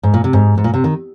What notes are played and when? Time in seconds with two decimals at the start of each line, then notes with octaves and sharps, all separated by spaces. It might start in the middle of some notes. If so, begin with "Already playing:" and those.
0.03 G#2
0.14 A#2
0.24 C3
0.33 G#2
0.58 G#2
0.64 A#2
0.74 C3
0.84 D#3